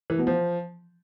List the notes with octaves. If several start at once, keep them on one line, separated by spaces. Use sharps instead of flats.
E3
B2
F3